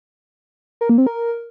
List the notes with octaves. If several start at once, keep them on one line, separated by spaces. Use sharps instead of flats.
A#4
A#3
C4
A#4